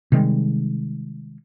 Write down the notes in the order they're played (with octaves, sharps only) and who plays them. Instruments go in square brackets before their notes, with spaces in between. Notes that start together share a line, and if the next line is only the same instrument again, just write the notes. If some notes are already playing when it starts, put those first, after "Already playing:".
[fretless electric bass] C3 D#3 G3 G#3